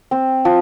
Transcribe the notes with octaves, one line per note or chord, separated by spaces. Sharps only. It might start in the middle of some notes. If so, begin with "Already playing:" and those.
C4
F3